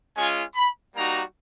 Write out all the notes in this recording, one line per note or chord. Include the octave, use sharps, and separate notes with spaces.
G#3 C#4 F4 G#5
B5
G3 A#3 D#4 F#4 A#5